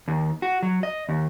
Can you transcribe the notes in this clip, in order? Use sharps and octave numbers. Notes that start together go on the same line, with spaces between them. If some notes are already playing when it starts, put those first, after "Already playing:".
D#2
F#4
F#3
D#5
D#2